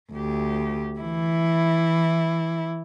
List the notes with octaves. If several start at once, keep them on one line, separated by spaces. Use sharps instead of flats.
D2 G4
E3 E4